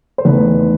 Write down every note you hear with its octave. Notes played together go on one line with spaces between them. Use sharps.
C5
E2 D#3 A3 B4